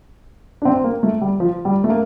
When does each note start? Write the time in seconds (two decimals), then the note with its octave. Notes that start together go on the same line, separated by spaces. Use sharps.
0.62 D4
0.65 C4
0.84 A#3
1.03 A3
1.21 G3
1.40 F3
1.65 G3
1.84 A3
1.90 A#3